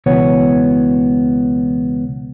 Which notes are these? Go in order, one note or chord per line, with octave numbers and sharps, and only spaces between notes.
C#2 B2 E3 B3 C#5